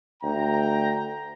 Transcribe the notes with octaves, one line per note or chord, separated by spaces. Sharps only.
D2 G5 A#5